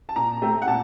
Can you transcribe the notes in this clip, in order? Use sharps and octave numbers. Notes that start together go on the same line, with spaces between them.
A5
A#2 A#5
A3 C4
F#5
A#2 A5